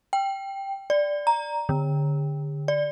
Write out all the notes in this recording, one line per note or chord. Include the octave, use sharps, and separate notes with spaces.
G5
D5
A#5
D3
D5